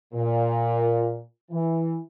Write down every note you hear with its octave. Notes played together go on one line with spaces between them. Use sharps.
A#2
E3